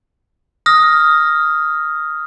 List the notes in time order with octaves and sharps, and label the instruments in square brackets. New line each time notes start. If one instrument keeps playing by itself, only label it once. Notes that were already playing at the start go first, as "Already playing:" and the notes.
[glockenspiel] D#6 F6 A#6